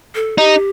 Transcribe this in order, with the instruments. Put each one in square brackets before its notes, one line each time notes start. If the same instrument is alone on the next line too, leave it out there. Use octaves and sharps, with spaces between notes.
[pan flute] A4
[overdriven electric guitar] D#4 [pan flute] G4